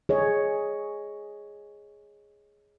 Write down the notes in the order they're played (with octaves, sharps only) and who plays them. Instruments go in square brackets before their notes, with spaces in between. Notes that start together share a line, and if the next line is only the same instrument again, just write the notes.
[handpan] G#4 C#5 D#5